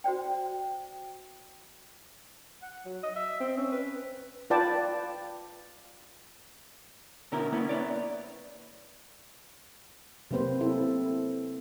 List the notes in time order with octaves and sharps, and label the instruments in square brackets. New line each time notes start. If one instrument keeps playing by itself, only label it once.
[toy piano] F#4 C5 D5 G5
[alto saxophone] F#5
F#3
D#5
E5
C4
C#4
B4
[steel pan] F4 B4 D5 G5 A5
[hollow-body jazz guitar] B2 D3 C#4 E4 A#4
A#3 B3 C#4 E4
E4 B4 C#5 D5
[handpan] C3 F#3 A#3 C4 B4 C5
C4 E4 A4